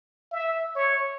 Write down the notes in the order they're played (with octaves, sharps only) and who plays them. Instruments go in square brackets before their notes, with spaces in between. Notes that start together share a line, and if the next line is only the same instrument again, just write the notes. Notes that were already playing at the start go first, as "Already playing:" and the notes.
[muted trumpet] E5
C#5